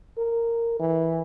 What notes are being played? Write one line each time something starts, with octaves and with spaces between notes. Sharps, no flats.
A#4
E3